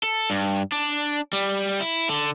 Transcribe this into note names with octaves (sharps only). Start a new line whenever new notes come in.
A4
G2
D4
G3
E4
D3